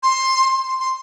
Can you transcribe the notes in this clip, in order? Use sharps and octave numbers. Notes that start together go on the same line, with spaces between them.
C6
C6
C6